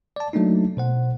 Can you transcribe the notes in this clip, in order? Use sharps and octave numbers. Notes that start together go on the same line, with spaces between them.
D5 A5
F#3 A3 A#3 D4 D#4
B2 C5 F#5